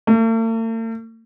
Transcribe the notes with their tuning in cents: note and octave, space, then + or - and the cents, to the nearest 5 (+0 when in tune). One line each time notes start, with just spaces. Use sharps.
A3 +45